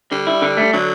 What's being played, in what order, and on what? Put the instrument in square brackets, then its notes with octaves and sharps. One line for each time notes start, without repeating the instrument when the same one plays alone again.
[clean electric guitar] D3 [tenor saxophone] G3
[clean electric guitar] E4
D3
A3
[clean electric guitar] D3 [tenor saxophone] F#3